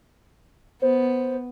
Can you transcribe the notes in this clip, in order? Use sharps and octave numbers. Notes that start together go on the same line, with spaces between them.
B3 C5